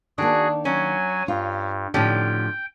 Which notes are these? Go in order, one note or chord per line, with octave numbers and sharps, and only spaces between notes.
D#3 A#3 D4 F#4 G#4
F#3 C#4 G#5
G2 F4
A2 D3 F3 C#4 D#4 G4 G5